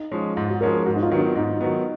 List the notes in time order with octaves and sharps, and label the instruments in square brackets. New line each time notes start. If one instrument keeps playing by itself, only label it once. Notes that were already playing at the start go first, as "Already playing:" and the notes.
Already playing: [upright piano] D#4
[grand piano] F3 G#3 C#4
[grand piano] G#2 [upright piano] F4
[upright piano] F#4
[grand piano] F3 G#3 C#4 [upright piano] A#4
[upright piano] G#4
[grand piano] G#2 [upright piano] F#4
[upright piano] D#4
F4
[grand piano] D#3 F#3 B3
[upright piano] D#4
[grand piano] G#2 [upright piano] D#4
[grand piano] D#3 F#3 B3